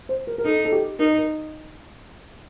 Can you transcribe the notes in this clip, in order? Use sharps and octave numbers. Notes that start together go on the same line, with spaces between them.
C5
A#4
A#4
D#4 A4
A4
G4
D#4 A#4
A#4